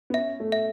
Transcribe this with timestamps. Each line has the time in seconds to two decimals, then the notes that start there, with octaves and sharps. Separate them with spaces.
0.10 B3
0.14 C#4 E5
0.40 A3
0.52 E5